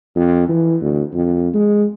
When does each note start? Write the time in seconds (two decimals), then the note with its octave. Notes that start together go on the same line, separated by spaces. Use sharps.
0.16 F2
0.49 E3
0.82 D2
1.14 F2
1.54 G#3